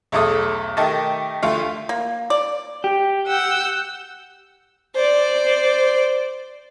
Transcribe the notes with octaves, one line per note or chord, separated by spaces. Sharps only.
B1 E2 A3 A4 D#6
D#3 A3 G4 D#5 A5
D2 A3 F4
A#3
D5
G4
F#5 E6 G6
C5 D5